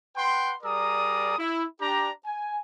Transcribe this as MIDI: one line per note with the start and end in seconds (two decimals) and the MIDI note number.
0.17 0.55 71
0.17 0.55 78
0.17 0.55 79
0.17 0.55 84
0.63 1.35 55
0.63 1.35 68
0.63 1.35 70
0.63 1.35 74
0.63 1.35 82
0.63 1.35 87
1.38 1.65 64
1.81 2.10 62
1.81 2.10 67
1.81 2.10 82
2.25 2.60 80